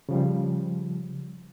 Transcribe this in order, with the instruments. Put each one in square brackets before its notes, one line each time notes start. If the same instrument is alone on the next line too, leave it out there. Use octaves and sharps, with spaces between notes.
[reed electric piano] C#3 F3 G3